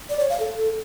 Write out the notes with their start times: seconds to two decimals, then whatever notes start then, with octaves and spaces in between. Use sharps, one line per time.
0.10 D5
0.20 C#5
0.30 F5
0.40 A4